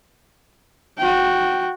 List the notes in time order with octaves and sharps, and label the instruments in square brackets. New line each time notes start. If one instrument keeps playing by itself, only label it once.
[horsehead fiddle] F#4 G5